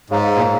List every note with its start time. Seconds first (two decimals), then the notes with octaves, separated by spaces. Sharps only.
0.10 G#2 G#4 C#5 F5 A#5
0.36 A#2